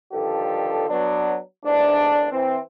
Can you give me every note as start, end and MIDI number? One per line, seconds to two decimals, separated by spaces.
0.13 0.89 43
0.13 0.89 50
0.13 0.89 51
0.13 0.89 53
0.13 0.89 67
0.13 0.89 69
0.89 1.38 54
0.89 1.38 59
0.89 1.38 62
1.65 2.27 33
1.65 2.27 40
1.65 2.27 44
1.65 2.27 62
2.31 2.58 52
2.31 2.58 60